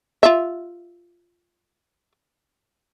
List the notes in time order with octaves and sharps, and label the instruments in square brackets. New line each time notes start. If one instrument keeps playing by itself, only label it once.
[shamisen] F4 E5